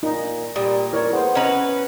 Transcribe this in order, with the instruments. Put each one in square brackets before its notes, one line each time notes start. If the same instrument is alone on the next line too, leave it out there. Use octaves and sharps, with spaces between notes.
[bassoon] A#2 [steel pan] D#4
[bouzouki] A#2 [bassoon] G3 [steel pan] D#6
[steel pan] E4 C#5 D5 [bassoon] A#4
[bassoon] B3 [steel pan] G#4 C5
[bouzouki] C#4 B4 [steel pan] C#5 D#5 A#5